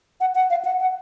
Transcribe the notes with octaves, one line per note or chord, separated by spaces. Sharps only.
F#5
F#5
F5
F#5
F#5